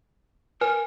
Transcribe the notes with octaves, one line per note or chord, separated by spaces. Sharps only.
A#4 B4 G#5